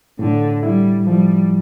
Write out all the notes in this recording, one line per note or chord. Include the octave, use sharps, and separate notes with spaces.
A2 D3
G3 E4
F3 G3